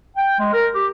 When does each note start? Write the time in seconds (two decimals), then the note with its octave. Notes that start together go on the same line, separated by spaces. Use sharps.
0.17 G5
0.39 G#3
0.53 A#4
0.75 G4